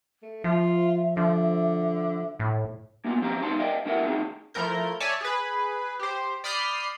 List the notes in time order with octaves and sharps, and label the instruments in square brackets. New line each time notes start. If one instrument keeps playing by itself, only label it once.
[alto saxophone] A3
[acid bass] F3 [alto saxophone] F4 [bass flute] E5
[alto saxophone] D3 [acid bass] F3
[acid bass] A2
[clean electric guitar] A#3 B3 F4
F3 C4 G4 F5 A#5
G#3 B3 D#4 F5 A5 C6
A#4 D5 D#5 F5 G5
D3 A3 E4 A#4 E5 F#5
A3 C4 D#4 G#4
[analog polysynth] F3 A3 E4 A#4 G6
C#5 D5 E5 G#5 A5
G#4 B4
G4 C5
D5 B5 D#6 F6 G6 C7